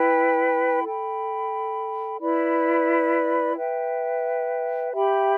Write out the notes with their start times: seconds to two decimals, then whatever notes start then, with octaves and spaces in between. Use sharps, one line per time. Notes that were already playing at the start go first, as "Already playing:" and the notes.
Already playing: E4 B4 G5 B5
0.84 A4 G5 B5
2.20 E4 B4 D5 B5
3.57 B4 E5 G5
4.93 G4 E5 G5 B5